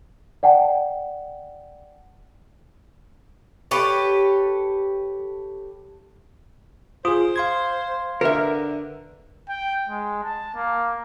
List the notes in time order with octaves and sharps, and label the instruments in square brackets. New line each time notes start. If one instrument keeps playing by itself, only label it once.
[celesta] D5 F#5 G5 A5
[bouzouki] G4 A4 B4 C#5
[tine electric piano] F4 G#4 [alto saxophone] C5 [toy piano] D#6
[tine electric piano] F5 C6 G#6
[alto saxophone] D3 [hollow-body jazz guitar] A#4 E5 [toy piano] B4
[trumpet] G5
G#3
A5
A#3